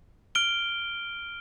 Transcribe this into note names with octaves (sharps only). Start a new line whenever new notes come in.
F6 D7 G7